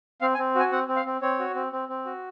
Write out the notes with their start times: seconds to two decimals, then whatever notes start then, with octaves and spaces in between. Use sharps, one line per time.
0.21 C4 F5
0.34 G#5
0.38 C4
0.55 F#4 G#5
0.71 C4 F#5
0.88 C4
0.96 F5
1.06 C4
1.21 C4 C#5
1.39 F#4
1.55 C4
1.73 C4
1.89 C4
2.05 F#4